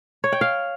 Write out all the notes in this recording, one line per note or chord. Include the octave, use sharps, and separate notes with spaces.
C#5
G5
F5